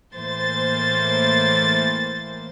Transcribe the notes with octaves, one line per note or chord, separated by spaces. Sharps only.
A2 E3 A#3 C5 A6